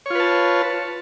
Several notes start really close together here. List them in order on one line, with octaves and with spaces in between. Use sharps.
C#5 F4 B4 A5